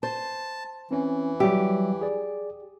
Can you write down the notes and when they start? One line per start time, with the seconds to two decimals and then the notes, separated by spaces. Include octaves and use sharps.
0.03 C5 A5
0.91 E3 C4 C#4
1.40 F#3 G3 G4 E5
2.02 G#4 D5